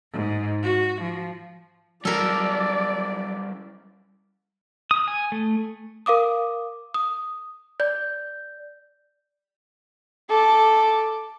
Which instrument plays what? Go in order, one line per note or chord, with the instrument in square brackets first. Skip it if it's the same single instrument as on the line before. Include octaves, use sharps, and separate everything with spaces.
[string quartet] G#2
F#4
F3
[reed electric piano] F#3 [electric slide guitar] G3 C#4 E4 [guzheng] A4 A#4 [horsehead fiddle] D5
[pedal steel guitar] D#6
G#5
A3
[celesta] A#4 F5 D6 D#6
D#6
D5 G6
[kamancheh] A4 D6